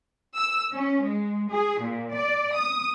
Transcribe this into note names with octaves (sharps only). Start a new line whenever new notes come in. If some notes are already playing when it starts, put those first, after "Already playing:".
E6
C#4
G#3
G#4
A#2
D5
D#6